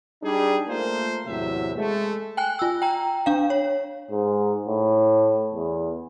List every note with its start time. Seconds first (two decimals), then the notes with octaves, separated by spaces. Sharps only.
0.23 G3 D4 D#4 G#4
0.68 A3 A#3 F4 A#4 C5
1.26 E2 A2 C3 F#3 E5
1.76 G#3 A3
2.37 G5 G#5 F#6
2.59 F4 E6
2.82 G5 A#5
3.26 D4 F5
3.50 C#5
4.11 G#2
4.67 A2
5.53 E2